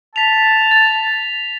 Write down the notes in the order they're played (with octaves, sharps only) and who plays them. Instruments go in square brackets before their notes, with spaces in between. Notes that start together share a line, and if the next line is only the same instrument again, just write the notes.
[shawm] A5 [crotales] B6 F7
[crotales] A6